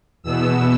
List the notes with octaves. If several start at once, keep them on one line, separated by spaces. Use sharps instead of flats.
E2 B2 B3 E6